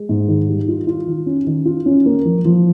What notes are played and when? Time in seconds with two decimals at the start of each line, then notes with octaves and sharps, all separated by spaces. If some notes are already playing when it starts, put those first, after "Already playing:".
Already playing: G#3
0.09 G#2
0.28 D#3
0.48 G3
0.68 F4
0.87 F4
1.07 D#3
1.26 C#4
1.47 D#3
1.65 F4
1.86 C#4
2.06 A#3
2.25 F3
2.45 F3